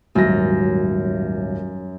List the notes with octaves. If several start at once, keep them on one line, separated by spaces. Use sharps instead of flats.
D#1 G#1 F#2 A#6